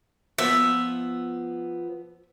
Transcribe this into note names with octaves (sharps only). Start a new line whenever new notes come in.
F3 B3 E5